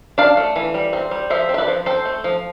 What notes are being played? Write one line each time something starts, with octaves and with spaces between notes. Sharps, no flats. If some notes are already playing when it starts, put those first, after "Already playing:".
D4 D5 F5
A3
E3
G3
C4
G3
F3 C5 E5
C4
E5
B4 D5
F3
C4 A4 C5
A3
F3